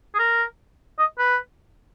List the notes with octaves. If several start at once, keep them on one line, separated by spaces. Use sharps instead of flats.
G#4
A#4
D#5
B4